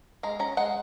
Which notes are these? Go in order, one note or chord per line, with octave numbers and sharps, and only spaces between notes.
G#3 A#5
C#4 A#5
G#3 F#5